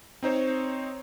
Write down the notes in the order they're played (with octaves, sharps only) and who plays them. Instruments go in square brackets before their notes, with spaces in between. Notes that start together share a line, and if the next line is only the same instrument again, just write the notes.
[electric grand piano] C4 D#4 C5 C#5